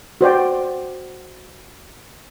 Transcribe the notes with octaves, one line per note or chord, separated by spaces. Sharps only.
F#4 C5 D5 G5